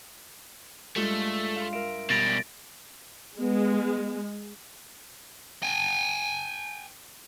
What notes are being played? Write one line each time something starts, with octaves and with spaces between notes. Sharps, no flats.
G2 G#3 A3 F4
F5 C6
A#4 E5 D7
B2 G3 A6 A#6 D7
G#3 B3
G5 G#5